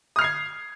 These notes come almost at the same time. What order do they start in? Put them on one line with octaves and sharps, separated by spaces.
D#6 F6 C7 G#6